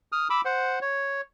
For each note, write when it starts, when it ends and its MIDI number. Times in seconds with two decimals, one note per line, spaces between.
0.12 0.28 87
0.12 0.28 89
0.30 0.41 83
0.30 0.41 86
0.30 0.41 88
0.45 0.79 72
0.45 0.79 78
0.82 1.21 73